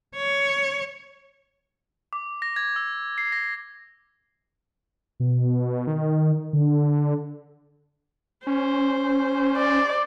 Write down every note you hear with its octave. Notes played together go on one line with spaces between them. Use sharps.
C#5
D6
A#6
G#6
E6
C7
A#6
B2
D#3
D3
C#4 C5
D5